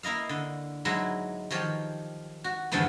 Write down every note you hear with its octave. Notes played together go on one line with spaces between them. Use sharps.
A#3 E4 D#5 F5
D3
G#2 F#3 G#3 E4
D#3 F3 G4 C#5
F#4
E2 G2 D3 F3 A3 B3